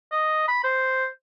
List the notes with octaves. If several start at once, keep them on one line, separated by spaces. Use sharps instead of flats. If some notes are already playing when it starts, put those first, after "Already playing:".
D#5
B5
C5